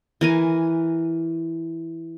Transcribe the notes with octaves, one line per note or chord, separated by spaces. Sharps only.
E3 A#4 G#5